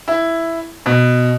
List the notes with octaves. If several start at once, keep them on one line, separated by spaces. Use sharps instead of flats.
E4
B2